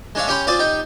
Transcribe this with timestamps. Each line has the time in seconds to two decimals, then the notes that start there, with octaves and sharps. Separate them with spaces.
0.15 G#3 D4 C#5 E5 F5
0.28 C#4 G4 C#5 G5 B5 C6
0.47 C4 F4 G#4 C5 D5
0.59 D#4 G4 G5